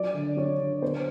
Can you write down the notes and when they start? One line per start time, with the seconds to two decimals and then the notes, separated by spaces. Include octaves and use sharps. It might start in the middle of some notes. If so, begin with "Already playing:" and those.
Already playing: F#3 D5
0.14 D3
0.36 F#3 C#5
0.59 D3
0.82 B3 C5